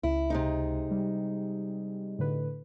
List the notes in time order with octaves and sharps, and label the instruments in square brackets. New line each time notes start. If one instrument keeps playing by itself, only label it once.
[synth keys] C#2 [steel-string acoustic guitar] E4
[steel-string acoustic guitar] C3 G#3 D#4
[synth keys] G3
A2 D3 B4